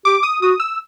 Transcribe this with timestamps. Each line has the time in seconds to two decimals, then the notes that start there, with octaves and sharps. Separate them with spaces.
0.05 G4 D6
0.23 D#6
0.42 F#4 D#6
0.60 E6